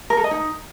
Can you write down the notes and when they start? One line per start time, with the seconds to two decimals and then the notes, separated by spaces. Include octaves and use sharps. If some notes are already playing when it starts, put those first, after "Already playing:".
0.10 A#4
0.17 A4
0.24 D#5
0.31 D#4